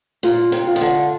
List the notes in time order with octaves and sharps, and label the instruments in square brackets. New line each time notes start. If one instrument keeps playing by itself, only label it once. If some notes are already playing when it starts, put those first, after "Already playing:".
[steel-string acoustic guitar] A#2 [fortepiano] F4
[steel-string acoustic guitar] C3
[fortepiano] F4
[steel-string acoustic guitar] D#3
D3